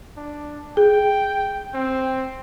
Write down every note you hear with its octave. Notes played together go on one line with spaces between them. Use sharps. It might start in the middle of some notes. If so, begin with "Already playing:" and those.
D4
G#4 G5
C4